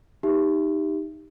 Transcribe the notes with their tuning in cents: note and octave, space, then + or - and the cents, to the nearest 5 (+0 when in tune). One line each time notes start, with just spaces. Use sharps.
D#4 +0 G4 +10 E5 +15